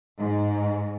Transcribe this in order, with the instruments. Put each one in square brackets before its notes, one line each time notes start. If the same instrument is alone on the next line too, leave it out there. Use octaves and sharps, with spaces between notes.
[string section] G#2